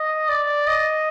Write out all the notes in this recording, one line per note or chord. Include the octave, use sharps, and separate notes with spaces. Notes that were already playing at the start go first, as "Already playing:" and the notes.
Already playing: D#5
D5
D#5